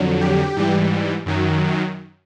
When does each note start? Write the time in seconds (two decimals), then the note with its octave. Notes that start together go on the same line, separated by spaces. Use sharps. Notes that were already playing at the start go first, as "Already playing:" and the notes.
Already playing: F2 D3 F#3
0.21 G4
0.56 G#2 E3 G3
1.26 F#2 D#3 F#3